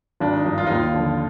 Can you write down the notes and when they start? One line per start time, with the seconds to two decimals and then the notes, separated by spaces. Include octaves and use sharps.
0.20 G#1 D4
0.33 D#4
0.45 G2 F3 D#4
0.58 F4
0.67 D#2 D#4
0.75 F4
0.94 D3 F3